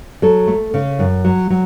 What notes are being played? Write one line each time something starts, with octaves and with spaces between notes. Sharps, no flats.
F#3 A4
A3
C#3
F#2
F#3
F#3